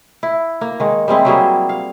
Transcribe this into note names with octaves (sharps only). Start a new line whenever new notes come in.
E4
A#3
D#3 G#3
G3 G#3 C4 E4
F#3 G3 A#3 G#4
F5